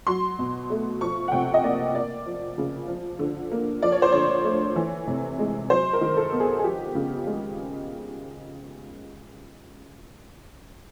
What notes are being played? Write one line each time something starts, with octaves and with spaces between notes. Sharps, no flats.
F#3 C6
B2
A3
F3 C#6
F#5
C3 G5
D#5
A#3 D5
A#3 D5
F3
C#3
F3
D3
A#3
F3 D5
C#5
C5
D3 C#5
A3
E3
C3
G#3
F#3 C5
A#4
D#3
A4
B3
G#4
G#4
F3 G4
C#3
G#3